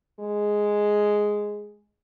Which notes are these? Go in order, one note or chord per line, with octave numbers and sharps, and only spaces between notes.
G#3